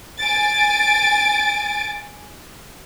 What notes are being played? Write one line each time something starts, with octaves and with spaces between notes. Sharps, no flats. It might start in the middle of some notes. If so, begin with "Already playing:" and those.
G#5 A6 D7